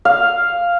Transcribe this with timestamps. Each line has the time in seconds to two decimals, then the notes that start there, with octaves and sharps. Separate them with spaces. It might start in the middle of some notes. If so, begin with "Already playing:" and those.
0.05 F5